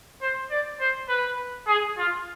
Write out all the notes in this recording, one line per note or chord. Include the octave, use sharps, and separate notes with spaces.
C5
D5
C5
B4
G#4
F4